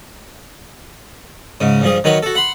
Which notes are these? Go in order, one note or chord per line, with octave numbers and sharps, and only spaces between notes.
G#2 C#3
G2 F3 G#4
D#3 F#3 B4 C#5 C#6
F#4 A4
F#5 B5 C6